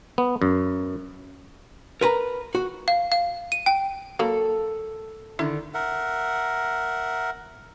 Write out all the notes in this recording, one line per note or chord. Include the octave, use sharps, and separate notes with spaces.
B3
F#2
A#4 B4 A#5
F#4
F5
F5
D#7
G5
F#3 A#3 A4 B5
D3 D#3 E4
A#4 E5 F#5